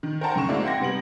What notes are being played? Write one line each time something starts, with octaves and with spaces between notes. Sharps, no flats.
D#3
A#4 C5 F#5 G5 A5 A#5
F#2 D3 C#6 E7
G#3 A#3 C4 E4 F#4 D5
F#5 G5 C6 G#6 A#6
C3 G3 B3 D7 F#7